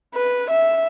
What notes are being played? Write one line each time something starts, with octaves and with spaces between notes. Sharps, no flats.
B4
E5